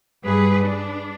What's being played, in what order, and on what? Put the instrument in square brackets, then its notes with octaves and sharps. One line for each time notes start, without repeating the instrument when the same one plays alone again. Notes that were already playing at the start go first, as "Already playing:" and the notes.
[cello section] G2 G#4 B4
D4